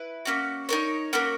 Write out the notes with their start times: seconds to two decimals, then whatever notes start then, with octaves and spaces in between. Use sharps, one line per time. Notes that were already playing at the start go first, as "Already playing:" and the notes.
Already playing: E4 B4
0.25 A#3 C#4 F#4
0.69 D#4 A#4 C#5
1.13 A#3 C#4 F#4 A#4